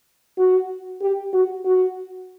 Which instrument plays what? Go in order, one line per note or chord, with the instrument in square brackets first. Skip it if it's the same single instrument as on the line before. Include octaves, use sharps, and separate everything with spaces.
[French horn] F#4
G4
F#4
F#4